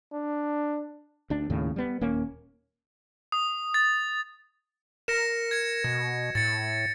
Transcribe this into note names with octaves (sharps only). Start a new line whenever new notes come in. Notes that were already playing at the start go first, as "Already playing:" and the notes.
D4
D2 D4
D#2 A2 C#3
G3 B3
D#1 A#3 C#4
D#6
A6
A#4 A#6 C#7 E7
G#6 C#7
B2
A2 A6 C#7